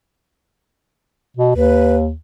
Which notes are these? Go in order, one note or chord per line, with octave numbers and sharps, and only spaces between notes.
B2
D#2 B4